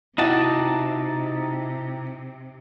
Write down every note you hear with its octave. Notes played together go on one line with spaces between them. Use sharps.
C3 D#4 E4 F#4 G4 G5 A5